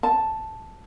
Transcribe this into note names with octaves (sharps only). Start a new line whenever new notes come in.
A5